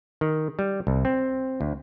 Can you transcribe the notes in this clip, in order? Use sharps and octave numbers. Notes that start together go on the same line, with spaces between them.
D#3
G3
C2
C4
D2